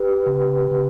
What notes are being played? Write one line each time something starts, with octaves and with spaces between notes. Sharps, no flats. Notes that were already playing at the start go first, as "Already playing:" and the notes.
Already playing: G4 B4
C#3
C#3